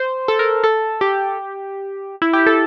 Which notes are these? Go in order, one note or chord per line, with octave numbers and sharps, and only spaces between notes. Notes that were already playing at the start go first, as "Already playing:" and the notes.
Already playing: C5
A4
A#4
A4
G4
E4
G4
A4